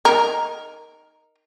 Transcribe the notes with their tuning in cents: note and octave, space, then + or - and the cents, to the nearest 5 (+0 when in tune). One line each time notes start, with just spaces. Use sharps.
D#4 +0 A#4 +0